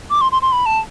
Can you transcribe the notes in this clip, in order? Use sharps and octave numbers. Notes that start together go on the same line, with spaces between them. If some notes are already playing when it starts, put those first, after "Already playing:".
D6
C6
C6
C6
B5
A5